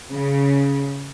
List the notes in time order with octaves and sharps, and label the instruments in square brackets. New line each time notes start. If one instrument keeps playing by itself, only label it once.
[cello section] C#3